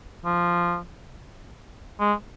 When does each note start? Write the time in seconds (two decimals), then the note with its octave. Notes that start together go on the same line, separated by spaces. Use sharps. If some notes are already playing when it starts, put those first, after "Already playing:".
0.25 F3
2.00 G#3